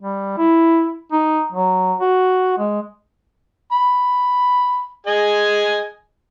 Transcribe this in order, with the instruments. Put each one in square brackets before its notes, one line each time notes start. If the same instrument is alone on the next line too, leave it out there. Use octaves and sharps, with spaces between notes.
[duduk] G3
E4
D#4
F#3
F#4
G#3
[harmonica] B5
G#4 D#5 G#5